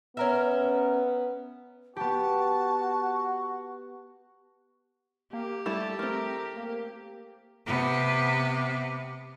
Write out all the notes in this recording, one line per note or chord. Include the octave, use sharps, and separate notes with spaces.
B3 C#4 A#4 E5
B3 F#4 G4 A5
A#3 G4
G3 A3 E4 A5
A3 C4 A#4
A#3
C3 B3